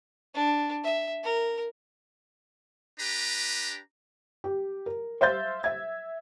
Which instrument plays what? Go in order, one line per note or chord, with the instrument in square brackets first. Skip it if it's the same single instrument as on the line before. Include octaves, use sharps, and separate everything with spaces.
[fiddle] D4
E5
A#4
[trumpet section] D4 G4 B4 A#5
[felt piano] G4
A#4
C5 E5 F5 C6 G6 A6
E5 G#6